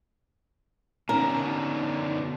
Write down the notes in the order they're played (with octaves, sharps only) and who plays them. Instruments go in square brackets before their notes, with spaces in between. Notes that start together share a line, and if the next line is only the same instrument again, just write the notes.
[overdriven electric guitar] B2 D3 [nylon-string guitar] C#4 [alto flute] D#4 [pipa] A#4